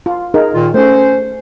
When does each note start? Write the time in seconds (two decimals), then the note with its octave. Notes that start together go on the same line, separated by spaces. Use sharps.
0.06 F4
0.34 D#4 G#4 A#4
0.53 A#2 D#3 F4
0.74 A3 C#4 C5